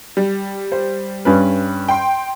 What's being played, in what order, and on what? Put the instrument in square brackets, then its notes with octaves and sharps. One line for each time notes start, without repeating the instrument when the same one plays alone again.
[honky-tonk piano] G3
[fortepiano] C5
G2 C#4 B4
[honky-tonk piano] G5 C6